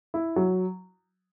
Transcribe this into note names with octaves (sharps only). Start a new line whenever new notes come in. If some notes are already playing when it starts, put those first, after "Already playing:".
E4
F#3